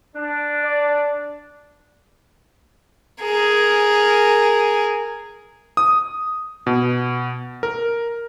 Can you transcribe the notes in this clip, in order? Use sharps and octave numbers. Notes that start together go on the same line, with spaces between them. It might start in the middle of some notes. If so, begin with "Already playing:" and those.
D4
D5
G#4 A#4
D#6
B2
A#4